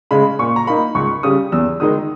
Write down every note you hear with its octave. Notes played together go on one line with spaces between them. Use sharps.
C#3 G#3 C#4 B5
A#2 C#6
A#5
A#3 D#4 B5
C#2 C#6
C#3 G3 D#6
E2 E6
D#3 G#3 D#4 D#6